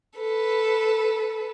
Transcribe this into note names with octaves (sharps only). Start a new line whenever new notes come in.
A4 B4